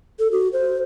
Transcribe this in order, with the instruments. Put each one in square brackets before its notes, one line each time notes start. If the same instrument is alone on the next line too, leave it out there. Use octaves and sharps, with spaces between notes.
[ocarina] A4
F#4
C5